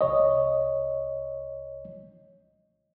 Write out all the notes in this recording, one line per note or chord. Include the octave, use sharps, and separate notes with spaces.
C2 C#5 D#5